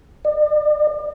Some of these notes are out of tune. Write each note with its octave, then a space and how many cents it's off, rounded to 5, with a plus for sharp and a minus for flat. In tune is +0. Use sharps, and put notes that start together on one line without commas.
D5 +40